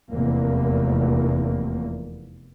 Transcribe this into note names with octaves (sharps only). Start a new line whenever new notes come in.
F1 E2 A#3